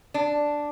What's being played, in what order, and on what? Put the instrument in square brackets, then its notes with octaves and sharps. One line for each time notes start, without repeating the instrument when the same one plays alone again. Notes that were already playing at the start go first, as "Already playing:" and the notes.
[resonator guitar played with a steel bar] D4